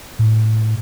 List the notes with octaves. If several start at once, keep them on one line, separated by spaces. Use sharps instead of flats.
A2